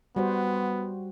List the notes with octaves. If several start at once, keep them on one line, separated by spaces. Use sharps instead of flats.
G3 B3 F#4 C5